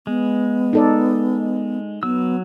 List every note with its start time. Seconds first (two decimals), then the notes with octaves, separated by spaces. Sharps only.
0.07 G#3 B3
0.73 D#4 A4 D5
2.03 F#3 B3 E6